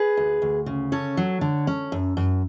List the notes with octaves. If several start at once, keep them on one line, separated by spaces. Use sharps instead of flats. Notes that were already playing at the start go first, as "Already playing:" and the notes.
Already playing: G#4 B4
D2
D2
C#3
C#4 A4 C#5
F#3
D3
C#4
F#2
F#2